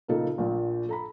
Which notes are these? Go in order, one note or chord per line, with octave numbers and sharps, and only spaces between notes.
A#2 C#3 F3 A#3 D#4 A4
A#1 A#2
A4 A#5 B5